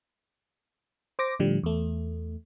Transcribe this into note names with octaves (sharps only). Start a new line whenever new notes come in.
C5 D6 A#6
A2 D3 F3 G3
E2 A3